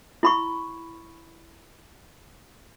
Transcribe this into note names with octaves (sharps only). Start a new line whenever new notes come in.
E4 B5 C#6